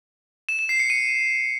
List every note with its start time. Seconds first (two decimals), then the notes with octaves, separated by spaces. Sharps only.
0.49 E7
0.59 E7
0.69 C7
0.80 C#7
0.90 D#7